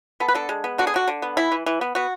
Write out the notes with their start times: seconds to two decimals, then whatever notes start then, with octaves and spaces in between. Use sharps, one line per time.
0.20 B3 A4
0.28 B4
0.34 D3 A4
0.49 G#3
0.64 B3
0.78 D3 F#4
0.87 G#4
0.94 D3 F#4
1.08 D3
1.22 B3
1.37 E3 E4
1.52 E3
1.66 E3
1.81 B3
1.95 B3 F#4